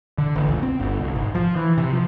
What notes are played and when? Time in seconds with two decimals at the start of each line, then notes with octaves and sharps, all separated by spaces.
0.18 D3
0.36 A1
0.49 C#2
0.63 C4
0.80 G1
1.00 C2
1.15 G#1
1.35 F3
1.56 E3
1.78 C3
1.93 F3